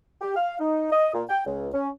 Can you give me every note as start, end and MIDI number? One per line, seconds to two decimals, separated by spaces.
0.21 0.33 67
0.36 0.56 77
0.60 0.89 63
0.91 1.09 75
1.14 1.23 46
1.29 1.41 79
1.46 1.68 37
1.73 1.88 61